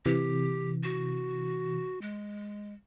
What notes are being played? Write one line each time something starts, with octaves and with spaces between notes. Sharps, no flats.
C3 E3 G4
F#4
G#3